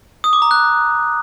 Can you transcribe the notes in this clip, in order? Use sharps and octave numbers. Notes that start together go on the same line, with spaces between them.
D#6
D6
A#5
F#6